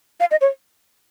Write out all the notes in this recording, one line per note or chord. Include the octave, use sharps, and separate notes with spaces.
F5
D#5
C#5